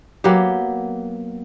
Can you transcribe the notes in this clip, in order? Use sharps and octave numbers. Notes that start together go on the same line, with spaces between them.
F#3 A#3 B3 G4